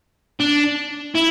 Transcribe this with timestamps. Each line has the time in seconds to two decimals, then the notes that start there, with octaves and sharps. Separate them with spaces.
0.40 D4
1.15 E4